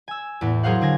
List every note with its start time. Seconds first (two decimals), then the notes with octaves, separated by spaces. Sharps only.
0.08 G#5 E6
0.41 E2 A2 B3
0.63 F#3 G#4 A#4 C5 F5 F#5
0.81 D3 D4 G#5 A#6